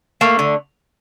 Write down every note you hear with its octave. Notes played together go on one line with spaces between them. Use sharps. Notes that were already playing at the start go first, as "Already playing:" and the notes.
A3 A#3
D3